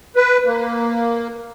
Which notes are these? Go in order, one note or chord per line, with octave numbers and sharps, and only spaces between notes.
B4
A#3